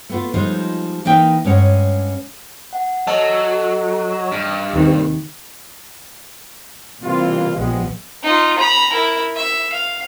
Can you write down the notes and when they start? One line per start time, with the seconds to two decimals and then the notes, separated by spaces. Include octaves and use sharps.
0.09 A3 B3 F4
0.34 F3 G3 G#3 D#4 F4
1.05 E3 A#3 D#4 A#4 E5 G5
1.44 G2 G#3 C#4 C#5 F#5
2.73 F#5
3.07 F#3 A4 D#5
4.32 G2
4.73 D#2 C3 D#3
7.04 C3 E3 G3 A#3 F4
7.55 A#1 F3 G3 G#3 B3
8.23 D#4 F4
8.59 A#5 B5
8.93 E4 A#4
9.36 E5
9.73 F5